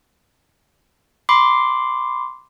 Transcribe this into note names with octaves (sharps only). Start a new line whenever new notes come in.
B5 C6 D6 C7